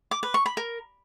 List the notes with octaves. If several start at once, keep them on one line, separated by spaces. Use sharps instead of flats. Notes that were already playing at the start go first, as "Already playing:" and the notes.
D6
B4
C#6
B5
A#4